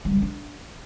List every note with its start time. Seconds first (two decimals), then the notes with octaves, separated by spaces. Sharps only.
0.05 F#3
0.11 G3
0.16 D#3
0.22 D4